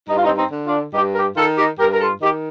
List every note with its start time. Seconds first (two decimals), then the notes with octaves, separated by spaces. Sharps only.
0.09 G2 D#4
0.17 F4
0.24 C4 D#4
0.38 C4 D#4
0.51 D3
0.66 D4 F4
0.94 G2 D#4 G4
1.15 G4 A#4
1.36 D#3 F4 A4
1.58 D#4 G4
1.79 G2 G4 A#4
1.93 A#4
2.00 F4 A4
2.22 D#3 D#4 G4